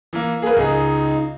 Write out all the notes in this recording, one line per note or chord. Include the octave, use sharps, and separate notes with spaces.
E3 A#3
A#3 G#4 A#4 B4
C#2 D#4 G#4